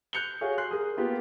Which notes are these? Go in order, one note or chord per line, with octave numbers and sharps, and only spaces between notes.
F#6 G6 C#7 F7 G7
F#4 G#4 C#5 F5 G#5
C6 F#6 C7
G#4 A#4 D#6
A#3 B3 F4 G4 B4